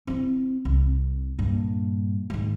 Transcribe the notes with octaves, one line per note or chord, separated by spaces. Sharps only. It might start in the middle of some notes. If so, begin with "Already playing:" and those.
C4 E4
C2
G2 A#2
G#2 D#3